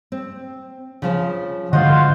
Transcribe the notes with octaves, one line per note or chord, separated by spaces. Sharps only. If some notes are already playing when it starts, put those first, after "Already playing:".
C4
C#3 F3 C5
G#2 B2 D3 F4 F#4 C5 D#5